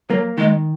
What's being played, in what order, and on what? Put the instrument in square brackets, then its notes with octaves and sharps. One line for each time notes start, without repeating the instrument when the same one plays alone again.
[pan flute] F#3 [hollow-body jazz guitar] A#3
[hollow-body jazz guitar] D#3 [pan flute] G#3